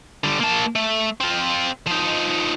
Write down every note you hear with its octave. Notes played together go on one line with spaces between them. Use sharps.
D3 G3
A#3 A5
A3
C4 F4
F3 D#4